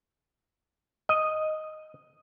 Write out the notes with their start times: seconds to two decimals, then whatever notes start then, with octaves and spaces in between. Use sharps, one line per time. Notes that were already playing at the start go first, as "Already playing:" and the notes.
1.09 D#5